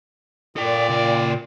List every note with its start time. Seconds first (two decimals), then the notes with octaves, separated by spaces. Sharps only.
0.57 A#2 A4 D5 G5
0.89 C#3 G5